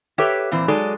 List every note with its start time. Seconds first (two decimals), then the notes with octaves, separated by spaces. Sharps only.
0.18 G4 A4 B4 C#5 E5 G5
0.51 A#2 E3 C4
0.68 F#3 G#3 D#4 A4 D5